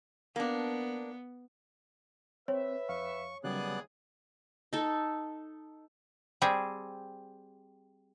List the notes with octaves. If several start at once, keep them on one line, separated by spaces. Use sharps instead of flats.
A#3 B3 D4
C4 B4 C#5 E5
F2 F5 C#6
D#2 C#3 F#3 G3 B3 G#4 D5 F#6
D#4 A4
G3 C4 G#4